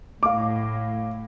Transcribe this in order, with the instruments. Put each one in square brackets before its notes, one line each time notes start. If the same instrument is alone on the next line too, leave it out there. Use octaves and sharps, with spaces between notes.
[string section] A2 [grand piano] F5 D6